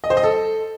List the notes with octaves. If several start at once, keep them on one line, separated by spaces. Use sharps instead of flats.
D#5
C5
D#5
A4